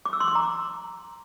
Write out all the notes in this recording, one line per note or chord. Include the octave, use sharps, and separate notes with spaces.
D6
E6
C6
D6
A#5